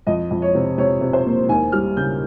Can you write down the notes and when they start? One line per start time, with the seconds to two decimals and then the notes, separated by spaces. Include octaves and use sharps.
0.07 F2 D#5
0.31 F2
0.42 C#5
0.55 C3
0.78 C3 C#5
1.01 C3
1.13 C5
1.26 A#3
1.49 D#2 G#5
1.72 G3 F6
1.97 C#3 G6